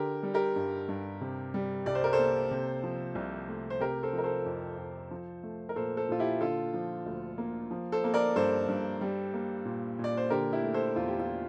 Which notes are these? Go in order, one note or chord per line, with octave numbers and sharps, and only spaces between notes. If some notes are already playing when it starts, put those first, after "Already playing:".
Already playing: D3 G4 A#4
G3
G4 A#4
G2
G2
C3
G3
C2 D5
C5
A#4
A4 C5
A#3
C3
F3
C2
A3
C5
C3 G4 A#4
A4 C5
F3
A#4
A4 C5
F2
F2
F3
A3
A#4
A#2 A4 C5
A4 C5
A#2 F4
E4 G4
D3 F4 A4
F3
D2
A#3
F3
A4 C5
A#3
A#4 D5
G2 A4 C5
G2
G3
A#3
A#2
A#2
D5
C5
D3 G4 A#4
E4 G4
A3
A4 C5
E2 F4
G4
F4